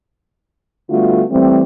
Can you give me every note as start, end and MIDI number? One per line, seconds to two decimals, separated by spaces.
0.90 1.23 50
0.90 1.23 55
0.90 1.23 57
0.90 1.23 59
0.90 1.23 65
0.90 1.23 66
1.31 1.63 52
1.31 1.63 55
1.31 1.63 57
1.31 1.63 60